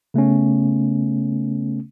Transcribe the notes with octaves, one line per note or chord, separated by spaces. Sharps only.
C#3 A3 B3 C#4